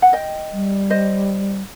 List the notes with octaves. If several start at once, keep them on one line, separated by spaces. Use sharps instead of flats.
F#5
D#5 G5
G3
C5 D#5